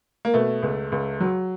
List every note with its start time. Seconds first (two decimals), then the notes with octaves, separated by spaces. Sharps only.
0.25 A#3
0.34 B2 A3
0.63 C#2
0.92 C#2
1.20 F#3